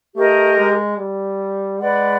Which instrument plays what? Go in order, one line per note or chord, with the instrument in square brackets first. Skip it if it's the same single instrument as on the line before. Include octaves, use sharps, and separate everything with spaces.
[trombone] A3 [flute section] G4 A#4 D#5
[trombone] G#3
G3
[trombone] G#3 [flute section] B4 D5 F#5